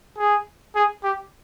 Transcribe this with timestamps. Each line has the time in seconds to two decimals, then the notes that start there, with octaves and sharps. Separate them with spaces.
0.18 G#4
0.75 G#4
1.04 G4